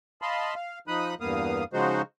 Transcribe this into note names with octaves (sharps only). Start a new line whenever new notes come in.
D#5 F5 A5 B5 C6
F5
F3 D#4 B5 D#6 F#6
E2 G2 A#3 B3 F5 D#6
C#3 F3 G#3 D#4 F#4 C5